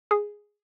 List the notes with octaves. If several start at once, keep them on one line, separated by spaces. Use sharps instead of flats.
G#4